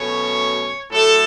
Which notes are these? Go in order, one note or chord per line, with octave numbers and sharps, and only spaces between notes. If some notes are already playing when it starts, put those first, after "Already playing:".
Already playing: B2 F#3 A3 C#4 C#5
A2 F#3 A3 A4